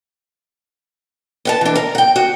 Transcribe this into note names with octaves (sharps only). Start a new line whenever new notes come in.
B3 F#5 A5
E3 D4
A#4
F#5 G5
F#4